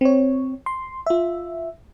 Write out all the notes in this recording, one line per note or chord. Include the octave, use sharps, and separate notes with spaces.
C4 C#5
C6
F4 E5